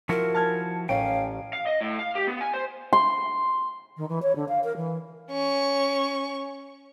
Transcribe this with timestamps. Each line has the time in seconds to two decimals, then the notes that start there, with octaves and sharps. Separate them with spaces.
0.09 F3 E4 F#4 A#4
0.34 A5 F6 G#6
0.89 A1 C#4 F5 G5 D#7
1.53 F5
1.67 D#5
1.81 A2
1.99 F5
2.15 G4
2.27 B3
2.41 G#5
2.54 C5
2.93 C6
3.97 D#3
4.09 E3
4.23 C#5
4.36 D3
4.48 F5
4.64 A#4
4.76 E3
5.30 C#4 C#6